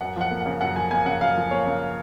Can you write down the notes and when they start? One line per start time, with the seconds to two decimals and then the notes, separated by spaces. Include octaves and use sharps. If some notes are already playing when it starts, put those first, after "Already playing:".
0.01 F#2 F#5
0.16 F3 F#5
0.31 A#3
0.41 F#5
0.46 C#3
0.61 F#2 F#5
0.76 F3 G#5
0.91 A#3 G#5
1.06 C#3 F#5
1.21 F#2 F5
1.36 F3
1.51 A#3 C#5
1.66 C#3